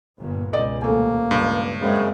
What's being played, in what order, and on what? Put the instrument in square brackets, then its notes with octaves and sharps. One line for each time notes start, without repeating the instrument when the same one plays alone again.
[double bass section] G1 G2 A#2
[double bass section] C#2 B2 [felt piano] D5 D#5
[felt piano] D#1 A3 G#5 [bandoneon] A#3
[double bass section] C#2 [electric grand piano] G2
[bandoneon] F#2 C#3 [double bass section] G#3 C4